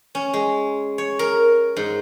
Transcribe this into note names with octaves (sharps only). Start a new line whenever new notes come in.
C#4
G#3
C#5
A#4
G#2